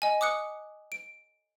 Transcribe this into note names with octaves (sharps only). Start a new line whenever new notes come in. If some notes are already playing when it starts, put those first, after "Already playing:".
D#5 G#5
D6 D#6 F#6 C#7
D7